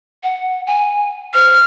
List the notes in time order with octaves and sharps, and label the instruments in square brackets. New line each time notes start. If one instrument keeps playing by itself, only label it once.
[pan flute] F#5
G#5
[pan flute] C5 [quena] F6